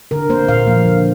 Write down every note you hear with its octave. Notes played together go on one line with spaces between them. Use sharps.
D3 A#4
A#3 C5
A#2 F5
F3 A#3
D3